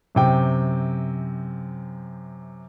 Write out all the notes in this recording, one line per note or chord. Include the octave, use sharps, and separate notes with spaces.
F#2 C3 G5